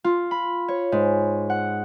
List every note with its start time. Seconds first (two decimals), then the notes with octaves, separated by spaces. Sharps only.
0.04 F4
0.31 B5
0.68 C#5
0.92 G#2
1.50 F#5